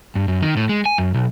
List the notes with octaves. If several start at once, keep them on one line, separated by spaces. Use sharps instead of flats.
G2
F#2
D#3
A2
G#3
G#5
F#2
B1